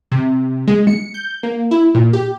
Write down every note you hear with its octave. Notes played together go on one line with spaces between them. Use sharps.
C3
G#3
C#7
G6
A#3
E4
A#2
G4